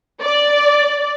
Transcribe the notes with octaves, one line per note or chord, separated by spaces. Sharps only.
D5